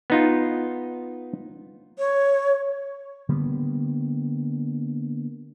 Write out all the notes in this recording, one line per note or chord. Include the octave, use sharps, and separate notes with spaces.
B3 D#4 F4
C#5
D3 G3 A#3 B3